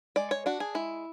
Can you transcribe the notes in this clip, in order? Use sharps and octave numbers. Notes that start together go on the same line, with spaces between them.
G#3 D5
C#5
D4 F#4
G#4
G#3 E4